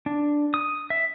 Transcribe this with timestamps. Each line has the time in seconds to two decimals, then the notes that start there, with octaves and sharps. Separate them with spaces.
0.06 D4
0.54 D#6
0.90 E5